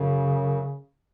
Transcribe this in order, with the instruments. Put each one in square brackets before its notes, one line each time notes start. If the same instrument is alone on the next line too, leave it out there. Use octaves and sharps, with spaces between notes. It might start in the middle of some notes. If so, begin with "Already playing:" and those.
Already playing: [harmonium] F#2 [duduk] C#3